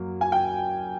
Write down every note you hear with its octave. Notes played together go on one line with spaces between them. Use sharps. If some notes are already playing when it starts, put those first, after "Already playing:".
Already playing: F#2 F#3 A#3
G#5
G5